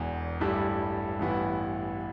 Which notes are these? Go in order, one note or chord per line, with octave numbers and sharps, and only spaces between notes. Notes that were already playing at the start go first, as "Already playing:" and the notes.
Already playing: E1 E2 E3
A1 G2 G3 E4 A4
A1 G2 E3 B3 E4